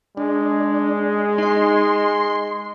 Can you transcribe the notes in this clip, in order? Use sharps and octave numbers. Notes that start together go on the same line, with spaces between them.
G#3 D4
D#4 D#5 C6